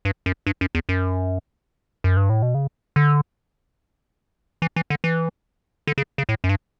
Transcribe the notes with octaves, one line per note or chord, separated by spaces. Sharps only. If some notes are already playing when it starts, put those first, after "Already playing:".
G2
F#2
G2
F#2
E2
F#2
F#2
G2
A2
B2
C#3
D3
E3
E3
D3
E3
D3
C#3
C#3
A2
F#2
G2